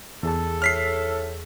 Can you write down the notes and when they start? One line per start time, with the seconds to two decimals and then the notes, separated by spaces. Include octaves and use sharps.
0.23 E2 G#4 A4 A5
0.62 A2 F6 B6 C7